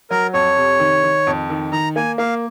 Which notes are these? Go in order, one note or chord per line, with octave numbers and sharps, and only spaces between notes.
F#3 A#4
F2 C#5
C3
D#3
D#3
F2
D#3
D#3 A#5
A#3 G#5
A#3 F5